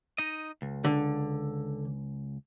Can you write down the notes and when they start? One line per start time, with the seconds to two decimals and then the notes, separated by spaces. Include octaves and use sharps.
0.18 D#4 D#5
0.62 C#2
0.84 D3